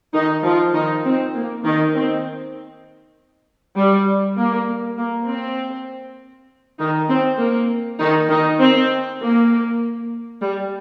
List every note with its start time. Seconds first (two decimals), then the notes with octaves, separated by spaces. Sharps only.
0.13 D#3 D#4
0.44 F3 F4
0.74 D#3 D#4
1.04 C4
1.34 A#3
1.65 D#3 D#4
1.95 C4
3.77 G3
4.37 A#3
4.98 A#3
5.28 C4
6.79 D#3 D#4
7.09 C4
7.39 A#3
7.99 D#3 D#4
8.29 D#3 D#4
8.60 C4
9.21 A#3
10.42 G3